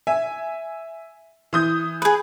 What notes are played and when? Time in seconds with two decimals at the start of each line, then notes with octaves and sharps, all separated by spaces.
0.07 E5 G#5
1.53 E3 D#6 G6
2.02 G#4 B4